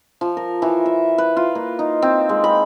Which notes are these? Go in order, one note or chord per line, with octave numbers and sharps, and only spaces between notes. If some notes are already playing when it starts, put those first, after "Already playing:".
F3
A#4
E3
E5
B4
F4
A#3
D#4
C4
G#3
B5